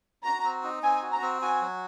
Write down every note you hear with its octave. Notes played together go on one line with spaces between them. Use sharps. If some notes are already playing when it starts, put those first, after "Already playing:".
F#4 A#5
C4
D#4
C4 G#5
F#4
A#5
C4
F#4 G#5
F#3